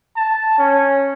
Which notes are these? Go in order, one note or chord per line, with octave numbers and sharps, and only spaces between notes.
A5
C#4